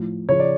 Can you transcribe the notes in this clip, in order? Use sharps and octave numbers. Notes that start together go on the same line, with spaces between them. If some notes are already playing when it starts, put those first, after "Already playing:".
Already playing: A2 F3
C#3 F3 C#5
D5